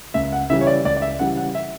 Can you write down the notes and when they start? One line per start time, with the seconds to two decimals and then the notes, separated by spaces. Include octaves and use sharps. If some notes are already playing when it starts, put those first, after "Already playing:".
0.14 C#2 E5
0.32 F#5
0.50 C#3 E3 G3 E5
0.61 C#5
0.67 D5
0.85 C#2 D5
0.97 D5
1.02 E5
1.19 C#3 E3 G3 F#5
1.37 F#5
1.55 E5